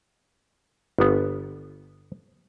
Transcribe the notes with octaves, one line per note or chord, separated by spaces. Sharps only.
G1 B3